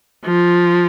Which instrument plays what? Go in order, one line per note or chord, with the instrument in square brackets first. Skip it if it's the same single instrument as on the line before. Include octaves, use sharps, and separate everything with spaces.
[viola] F3